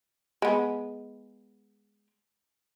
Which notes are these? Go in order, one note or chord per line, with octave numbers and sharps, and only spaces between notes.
G#3 B3